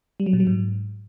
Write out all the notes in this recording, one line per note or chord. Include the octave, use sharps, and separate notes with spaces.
G3
F#3
A#2
F#3
G#2